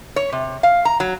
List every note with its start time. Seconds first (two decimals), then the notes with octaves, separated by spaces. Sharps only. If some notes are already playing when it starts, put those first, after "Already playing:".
0.16 C#5
0.32 C3
0.63 F5
0.85 A#5
1.00 F#3